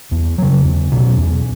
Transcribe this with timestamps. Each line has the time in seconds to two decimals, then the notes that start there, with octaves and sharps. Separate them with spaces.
0.11 E2
0.38 C#3 F#3
0.65 E2
0.92 B2 F#3 C#4
1.18 E2